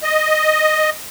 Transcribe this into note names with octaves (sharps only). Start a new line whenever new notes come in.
D#5